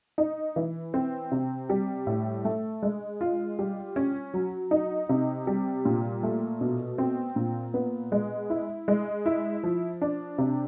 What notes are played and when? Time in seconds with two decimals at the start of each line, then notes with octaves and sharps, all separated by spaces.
0.18 D#4
0.56 E3
0.94 C4
1.32 C3
1.70 G3
2.07 A2
2.45 A3
2.83 G#3
3.21 F4
3.59 G3
3.96 C#4
4.34 F#3
4.71 D#4
5.09 C3
5.47 G3
5.85 A#2
6.23 A3
6.61 B2
6.98 C4
7.36 A#2
7.74 B3
8.12 G#3
8.50 E4
8.88 G#3
9.26 E4
9.64 F3
10.02 D4
10.38 C3